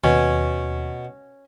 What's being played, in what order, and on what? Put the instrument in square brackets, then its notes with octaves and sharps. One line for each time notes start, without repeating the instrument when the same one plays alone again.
[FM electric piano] D#2 [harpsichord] B2 [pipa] C#4